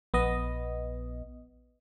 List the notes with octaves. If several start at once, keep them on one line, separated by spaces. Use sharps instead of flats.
A#1 B3 D#5